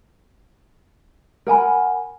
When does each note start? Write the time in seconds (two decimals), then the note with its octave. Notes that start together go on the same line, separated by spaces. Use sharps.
1.47 A#4 F#5 G#5 B5